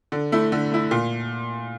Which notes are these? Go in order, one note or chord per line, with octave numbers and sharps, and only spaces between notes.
D3
A3 E4
D3
A3 E4
A#2